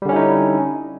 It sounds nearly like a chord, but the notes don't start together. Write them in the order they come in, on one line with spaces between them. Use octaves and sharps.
G3 D3 C#4 E4 D#4